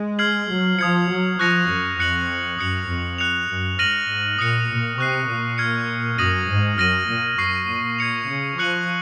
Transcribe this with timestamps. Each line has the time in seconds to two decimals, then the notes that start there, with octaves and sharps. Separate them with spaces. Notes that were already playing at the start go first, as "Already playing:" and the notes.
Already playing: G#3
0.19 F6 G#6 C7 F#7
0.50 F#3
0.79 F3 D#6 G#6 C#7
1.09 F#3
1.39 F3 C#6 F#6 A#6 C#7 F7
1.69 F#2
1.99 F2 F#6 C#7 F#7
2.59 F#2 D#6 F#6 C#7 F#7
2.89 F2
3.18 F#6 C#7 F7
3.48 F#2
3.78 G#2 F6 A#6 D#7 F#7
4.08 G#2
4.39 A#2 D#6 F#6 C#7 F#7
4.69 A#2
4.98 C3 C#6 F#6 C7
5.28 A#2
5.58 F6 G#6 C#7
6.18 F#2 D#6 A#6 D#7 F#7
6.49 G#2
6.78 F#2 F6 A#6 D#7 F#7
7.08 A#2
7.38 F#2 C#6 F6 C7
7.69 A#2
7.99 G#6 C#7 F7
8.28 C#3
8.58 F3 C#6 F#6 C#7 F#7